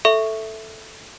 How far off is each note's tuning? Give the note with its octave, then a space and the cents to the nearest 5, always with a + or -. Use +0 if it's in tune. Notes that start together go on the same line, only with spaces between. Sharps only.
A4 +0 E5 +0 C#6 +0